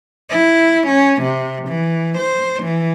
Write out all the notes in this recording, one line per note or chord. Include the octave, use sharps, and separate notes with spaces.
E4
C#4
C3
E3
C5
E3